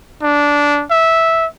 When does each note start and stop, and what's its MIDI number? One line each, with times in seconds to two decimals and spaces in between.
0.23 0.84 62
0.91 1.46 76